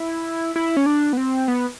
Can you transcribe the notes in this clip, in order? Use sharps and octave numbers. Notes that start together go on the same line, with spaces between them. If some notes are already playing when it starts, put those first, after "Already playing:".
Already playing: E4
E4
C#4
D4
B3
C4
B3